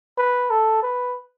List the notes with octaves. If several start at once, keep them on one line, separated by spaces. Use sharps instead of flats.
B4
A4
B4